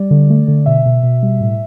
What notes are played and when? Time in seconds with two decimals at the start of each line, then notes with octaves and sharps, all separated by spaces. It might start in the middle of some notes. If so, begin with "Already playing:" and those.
Already playing: G3 D5
0.11 D3
0.30 A3
0.48 D3
0.66 B2 E5
0.86 B2
1.03 B2
1.23 G3
1.40 A2